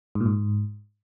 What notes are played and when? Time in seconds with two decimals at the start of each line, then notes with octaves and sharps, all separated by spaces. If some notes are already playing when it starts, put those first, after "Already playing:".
0.15 G#2
0.20 A#2
0.26 G#2